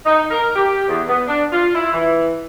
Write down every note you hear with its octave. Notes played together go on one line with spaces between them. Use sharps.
D#4
A#4
G4
E2
B3
D4
F4
E4
E3